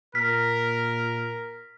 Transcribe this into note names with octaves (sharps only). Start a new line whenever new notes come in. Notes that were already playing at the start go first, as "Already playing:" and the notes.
A#2 A#4 F6 B6